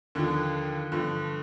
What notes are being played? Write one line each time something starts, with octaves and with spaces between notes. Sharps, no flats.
D#2 D3 F3
G2 D3 F3